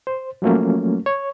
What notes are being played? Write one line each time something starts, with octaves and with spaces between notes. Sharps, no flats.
C5
F3 F#3 A3 A#3 C#4
C#5